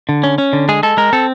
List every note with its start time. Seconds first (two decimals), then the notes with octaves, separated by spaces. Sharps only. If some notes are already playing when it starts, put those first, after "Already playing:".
0.09 D3
0.24 C#4
0.38 C#4
0.53 D3
0.69 G#3 G#4
0.83 G#3 A4
0.97 G#3 A#4
1.13 C4 A4